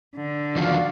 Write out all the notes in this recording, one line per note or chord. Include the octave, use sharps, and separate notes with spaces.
D3
E2 D#3 F3 F#4 D5 F5